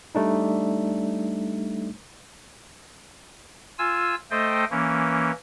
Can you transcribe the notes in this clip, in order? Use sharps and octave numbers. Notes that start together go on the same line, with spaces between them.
G3 A3 D4 D#4
F4 G#5 E6
A3 A4 C5 D#5 G5
E3 A#3 C#4